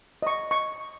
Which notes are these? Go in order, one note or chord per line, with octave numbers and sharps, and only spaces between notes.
D#5 C#6
C#6